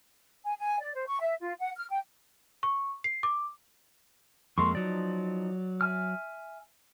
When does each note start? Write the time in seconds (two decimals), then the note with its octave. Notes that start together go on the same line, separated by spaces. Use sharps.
0.45 G#5
0.59 G#5
0.80 D5
0.94 C5
1.07 C#6
1.20 E5
1.41 F4
1.60 F#5
1.77 F6
1.90 G5
2.63 C#6
3.04 C7
3.23 D6
4.58 F2 G#3 A#3 A4 C6 C#6
4.75 F3 F#3 D#4 D5
5.81 E5 G#5 F6